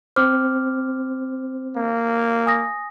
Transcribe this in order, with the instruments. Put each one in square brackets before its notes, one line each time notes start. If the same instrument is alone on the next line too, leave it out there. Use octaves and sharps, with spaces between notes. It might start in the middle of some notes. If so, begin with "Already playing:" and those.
[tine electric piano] C4 C5 [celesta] D6 F6
[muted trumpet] A#3
[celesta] G#5 D#6 A#6